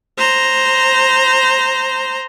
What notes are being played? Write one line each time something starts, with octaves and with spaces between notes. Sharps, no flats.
C5 A#5